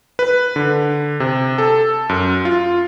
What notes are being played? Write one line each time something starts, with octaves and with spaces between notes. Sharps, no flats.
B4
D3
C3
A4
F#2
F4